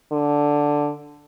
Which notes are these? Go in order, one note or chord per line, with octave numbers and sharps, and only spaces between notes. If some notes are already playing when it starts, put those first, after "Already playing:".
D3